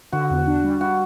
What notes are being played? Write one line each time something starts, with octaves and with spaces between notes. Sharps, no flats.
D3 F#4
E2
D4
G3
G3 F#4